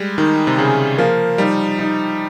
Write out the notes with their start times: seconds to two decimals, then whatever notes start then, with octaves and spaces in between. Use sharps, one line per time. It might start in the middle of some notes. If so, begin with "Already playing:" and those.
Already playing: G3 G#3
0.18 D#3 D#4
0.47 C3
0.58 C#3 G#4
0.98 F3 A#3
1.38 G3 D#4
1.79 D#4